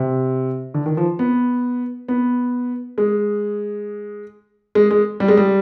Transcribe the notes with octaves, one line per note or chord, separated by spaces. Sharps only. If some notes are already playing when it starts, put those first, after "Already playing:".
Already playing: C3
D3
D#3
F3
B3
B3
G#3
G#3
G#3
G3
G#3
G3